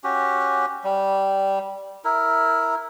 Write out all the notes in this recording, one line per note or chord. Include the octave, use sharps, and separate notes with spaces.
C#4 F#4 G4
G3
E4 A#4